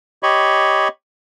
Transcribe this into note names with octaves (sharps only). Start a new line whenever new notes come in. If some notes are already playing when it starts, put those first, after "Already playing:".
G4 C#5 D#5 B5 C#6